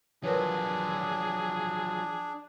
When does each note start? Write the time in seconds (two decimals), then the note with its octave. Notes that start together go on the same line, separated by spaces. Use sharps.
0.23 F3 F#3 D4 G#4 A#4 B4 C#5